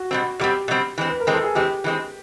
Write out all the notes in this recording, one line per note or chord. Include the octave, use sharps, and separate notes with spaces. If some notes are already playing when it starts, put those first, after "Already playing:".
Already playing: F#4
B2 G3 C4
B2 G3 C4 G4
B2 G3 C4
E3 G#3 C4
B4
A#4
E3 G#3 C4
A4
G#4
E3 G#3 C4 G4
E3 G#3 C4